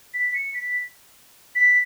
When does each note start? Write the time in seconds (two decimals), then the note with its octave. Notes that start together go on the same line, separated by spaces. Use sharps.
0.14 B6
0.34 C#7
0.54 B6
1.55 B6